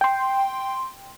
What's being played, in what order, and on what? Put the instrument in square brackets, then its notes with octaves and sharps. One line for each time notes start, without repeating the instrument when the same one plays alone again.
[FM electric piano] G5 C6